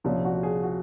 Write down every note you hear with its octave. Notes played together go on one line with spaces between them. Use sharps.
C2 A#2 F3 C#4
F#4
G#4
F#4